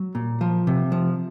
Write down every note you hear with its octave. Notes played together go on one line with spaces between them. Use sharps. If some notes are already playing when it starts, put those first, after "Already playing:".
Already playing: F#3
A#2
F3
C3
F3